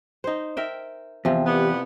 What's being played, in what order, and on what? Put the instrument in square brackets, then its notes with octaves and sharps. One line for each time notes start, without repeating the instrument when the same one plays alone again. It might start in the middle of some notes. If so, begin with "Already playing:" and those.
[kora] D#4 C5
A#4 E5 G5
[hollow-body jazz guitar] E2 [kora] C3 F3
[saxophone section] E3 G3 B3 [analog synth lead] G4